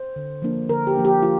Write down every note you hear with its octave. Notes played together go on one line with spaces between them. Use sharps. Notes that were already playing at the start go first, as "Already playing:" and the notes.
Already playing: C5
D3
F3 A#3 D4
D3 A#4
G4
F3 A#3 D4
G4
F3 F4